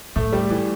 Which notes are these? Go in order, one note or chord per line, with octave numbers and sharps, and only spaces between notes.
A2 A3
G3
E3